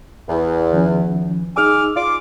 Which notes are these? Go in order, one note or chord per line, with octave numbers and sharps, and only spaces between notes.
E2
D#3 F3 C#4
D#4 G#4 G#5 D6 E6 F6
F4 D6